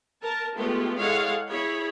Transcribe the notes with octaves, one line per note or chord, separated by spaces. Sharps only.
A#4 A5
G#3 A3 B3 F4 G4
G#3 E4 A4 C#5 F5 F#5
E4 G#4 C#5 B5